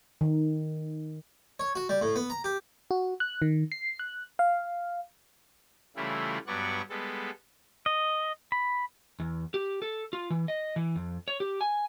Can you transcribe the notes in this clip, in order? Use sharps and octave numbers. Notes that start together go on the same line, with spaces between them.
D#3
C#5
F#4
G3
A2
B3
A#5
G4
F#4
F#6
D#3
C7
F#6
F5
C#3 E3 G3 A3 E4 F4
G2 F#3 B3 D5 F#5 C#6
G3 G#3 B3 A4
D#5
B5
E2
G4
A4
F4
E3
D#5
E3
F2
C#5
G4
G#5